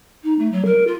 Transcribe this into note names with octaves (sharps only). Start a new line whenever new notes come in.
D#4
A3
F#3
A#4
F4